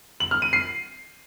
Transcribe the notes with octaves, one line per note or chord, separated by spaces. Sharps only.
F#7
F6
D#7
C7